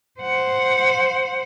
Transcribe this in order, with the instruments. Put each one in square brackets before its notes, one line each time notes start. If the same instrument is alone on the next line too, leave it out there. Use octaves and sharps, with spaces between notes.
[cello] C5 F#5